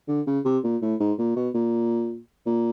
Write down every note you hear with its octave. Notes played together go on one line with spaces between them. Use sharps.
D3
C#3
C3
A#2
A2
G#2
A#2
B2
A#2
A#2